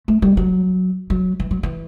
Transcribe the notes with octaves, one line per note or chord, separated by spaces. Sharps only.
A3
G3
F#3
F#3
E3
F#3
E3